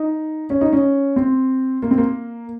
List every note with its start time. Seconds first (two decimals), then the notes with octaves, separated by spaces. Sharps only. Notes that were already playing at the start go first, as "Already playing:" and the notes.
Already playing: D#4
0.50 C#4
0.61 D#4
0.73 C#4
1.16 C4
1.82 A#3
1.91 C4
1.98 A#3